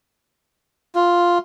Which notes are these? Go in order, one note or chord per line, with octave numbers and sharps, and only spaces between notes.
F4